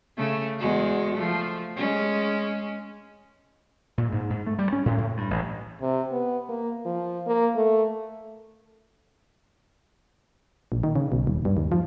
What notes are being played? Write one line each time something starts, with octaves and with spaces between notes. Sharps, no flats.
C#3 A3
E2 G#3 F#4
F3 A3
G#3 C#4
A#2
G#2
G#2
A3
G3
C#4
A2
A2
G2
A1
C3
B3
A#3
F3
A#3
A3
A#1
D#3
C#3
B1
D#1
G2
D#2
F3